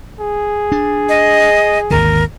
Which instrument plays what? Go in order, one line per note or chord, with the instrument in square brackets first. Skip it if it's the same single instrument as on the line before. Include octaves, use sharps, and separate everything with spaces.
[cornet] G#4
[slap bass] D4
[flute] D#5
[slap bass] G#1 D#2 D3 [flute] A#4